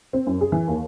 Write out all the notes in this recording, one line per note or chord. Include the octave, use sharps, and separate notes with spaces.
C4
F#2
G#4
E3
D#2